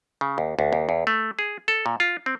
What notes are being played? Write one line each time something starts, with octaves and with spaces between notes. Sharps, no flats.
C#3
D#2
D2
D#2
E2
A3
G#4
A4
A#2
F4
C4